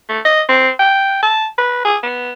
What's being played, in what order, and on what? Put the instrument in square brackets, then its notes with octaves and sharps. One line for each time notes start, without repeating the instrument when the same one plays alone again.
[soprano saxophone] A3
D#5
C4
G5
A5
B4
G#4
B3